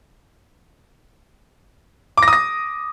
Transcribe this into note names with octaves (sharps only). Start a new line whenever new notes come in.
D6
A#6
D#6
A#6